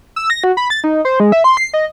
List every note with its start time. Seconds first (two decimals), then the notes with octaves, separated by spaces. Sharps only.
0.16 E6
0.30 A#6
0.44 F#4
0.57 B5
0.70 A6
0.84 D#4
1.05 C5
1.20 G#3
1.32 E5
1.44 C6
1.57 C7
1.74 D#5